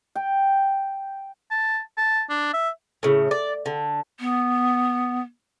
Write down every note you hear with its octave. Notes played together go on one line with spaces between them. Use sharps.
G5
A5
A5
D4
E5
A2 C#3
D5
D3
B3